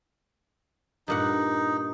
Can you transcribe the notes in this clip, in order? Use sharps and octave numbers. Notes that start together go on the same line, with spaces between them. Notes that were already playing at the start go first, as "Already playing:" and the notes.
G2 A#2 D#4 F#5